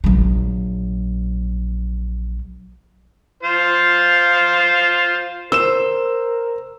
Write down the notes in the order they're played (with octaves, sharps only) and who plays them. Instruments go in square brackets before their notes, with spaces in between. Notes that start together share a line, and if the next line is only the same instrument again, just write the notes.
[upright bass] A#1 F#3
[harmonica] F4 C5
[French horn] A#4 [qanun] C5 [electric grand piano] E6 E7